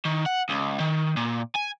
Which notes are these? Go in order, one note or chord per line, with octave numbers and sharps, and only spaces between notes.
D#3
F#5
C#2
D#3
A#2
G#5